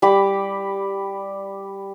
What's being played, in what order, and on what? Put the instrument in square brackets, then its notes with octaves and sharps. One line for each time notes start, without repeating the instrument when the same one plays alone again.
[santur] G3 G4 B5 D6